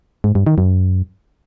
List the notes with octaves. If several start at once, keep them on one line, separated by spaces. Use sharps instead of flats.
G#2
G2
D#3
F#2